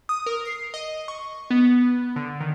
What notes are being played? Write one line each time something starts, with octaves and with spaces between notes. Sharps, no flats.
D#6
A#4
C7
D#5
C#6
B3
D3
D#3